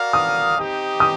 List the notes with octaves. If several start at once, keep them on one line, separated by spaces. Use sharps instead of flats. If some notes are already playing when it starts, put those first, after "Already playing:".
Already playing: F#4 A#4 D5 F5
D#6
C4 D#4 G4
D#6